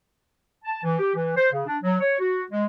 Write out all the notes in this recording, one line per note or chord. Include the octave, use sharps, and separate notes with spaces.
A5
E3
G4
E3
C5
C#3
D4
F#3
C#5
F#4
G#3